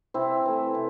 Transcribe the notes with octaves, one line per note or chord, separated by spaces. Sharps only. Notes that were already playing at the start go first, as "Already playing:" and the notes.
C3 C4 E4
E3 A3
C3